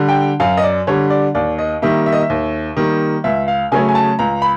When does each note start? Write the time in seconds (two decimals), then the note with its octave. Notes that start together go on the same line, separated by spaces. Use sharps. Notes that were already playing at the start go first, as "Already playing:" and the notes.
Already playing: D3 G3
0.08 G5
0.40 F#2 F5
0.57 D#5
0.63 D5
0.87 D3 G3 C#5
1.10 D5
1.35 D#2 D5
1.59 D#5
1.82 D#3 G3 A#3 E5
2.06 E5
2.13 D#5
2.21 E5
2.30 D#2
2.77 D#3 G3 A#3
3.24 C#2 E5
3.48 F5
3.72 C#3 F#3 A3 C#4 G#5
3.88 G#5
3.95 A5
4.19 C#2 A#5
4.42 B5